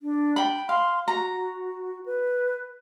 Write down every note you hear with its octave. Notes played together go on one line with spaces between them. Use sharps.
D4
G5 B5
F5 C6
F#4 A#5
B4